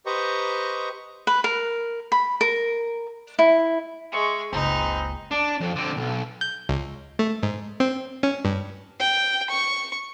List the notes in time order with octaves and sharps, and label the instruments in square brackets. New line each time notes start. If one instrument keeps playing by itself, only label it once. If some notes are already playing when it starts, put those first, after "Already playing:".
[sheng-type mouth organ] G4 B4 C5 D#5 A#5 C#6
[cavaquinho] B4
A#4
B5
A#4
E4
[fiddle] G#3 [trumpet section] E5 C#6
[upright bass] F#1 C#2 [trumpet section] C4 G#4 B4 [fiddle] D#4
[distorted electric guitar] D4
F2
D3 C4
B1
[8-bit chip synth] G6
C#2
A3
G#2
C4
C#4
G2
[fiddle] G5
C#6